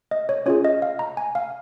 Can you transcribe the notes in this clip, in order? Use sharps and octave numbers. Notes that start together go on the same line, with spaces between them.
D#5
C#5
C#4 F4 G#4 C#5
D#5
F5
A#5
G#5
F5